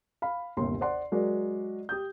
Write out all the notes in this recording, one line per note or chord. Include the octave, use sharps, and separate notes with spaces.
F5 B5
G1 D#2 C3 C6
C5 D5 F#5 C6
F#3 G#3 F#4 A#4 D5
G4 D#6 G6